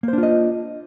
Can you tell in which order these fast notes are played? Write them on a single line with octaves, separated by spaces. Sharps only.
A#3 C5 D4 F4 D#5